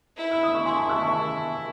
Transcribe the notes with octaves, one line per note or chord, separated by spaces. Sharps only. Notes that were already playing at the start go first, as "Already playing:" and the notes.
E4
E6
D#6
C#6
E4 G#5 C6
A5 C#6
C#6 E6
A5 C#6